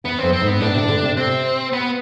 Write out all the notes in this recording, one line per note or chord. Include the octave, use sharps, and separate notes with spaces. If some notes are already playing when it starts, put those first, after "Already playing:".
E2 B3
F2 C4
C4
G#2
B3
A2 D4
C3
E3
D3
C3
C3 C4
B3